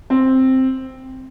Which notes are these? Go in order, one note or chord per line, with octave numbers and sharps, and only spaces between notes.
C4